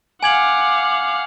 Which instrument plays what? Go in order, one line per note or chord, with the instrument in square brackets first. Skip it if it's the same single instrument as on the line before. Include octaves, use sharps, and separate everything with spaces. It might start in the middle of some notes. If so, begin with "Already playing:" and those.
[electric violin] F5 F#5 [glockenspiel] G#5 G#6 F#7 [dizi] D6